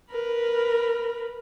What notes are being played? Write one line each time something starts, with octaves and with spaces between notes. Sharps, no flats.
A#4 B4